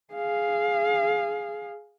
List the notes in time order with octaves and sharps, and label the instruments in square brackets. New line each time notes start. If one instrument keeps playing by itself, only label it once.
[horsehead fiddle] G#4 F5